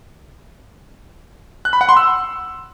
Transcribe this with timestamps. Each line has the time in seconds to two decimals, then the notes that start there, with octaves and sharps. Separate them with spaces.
1.65 F#6
1.73 B5
1.81 F#5
1.89 C6
1.96 E6